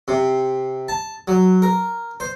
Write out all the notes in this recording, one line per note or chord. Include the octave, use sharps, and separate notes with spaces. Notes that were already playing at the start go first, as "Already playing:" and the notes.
C3
A5
F#3
A#4
C5